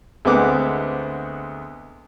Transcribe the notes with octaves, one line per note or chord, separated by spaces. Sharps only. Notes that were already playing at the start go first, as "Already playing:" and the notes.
D2 G#3 B3 C4 F#5 D6